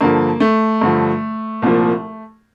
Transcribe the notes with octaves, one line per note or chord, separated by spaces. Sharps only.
G2 D3 F3 A#3
A3
G2 D3 F3
C2 A#2 F3